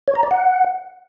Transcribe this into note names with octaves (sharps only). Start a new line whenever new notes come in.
C#5
A#5
D5
F#5